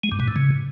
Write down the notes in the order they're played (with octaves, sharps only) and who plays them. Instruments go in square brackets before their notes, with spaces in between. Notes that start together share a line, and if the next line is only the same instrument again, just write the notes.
[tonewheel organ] G#3
G2
B2
A2
C#3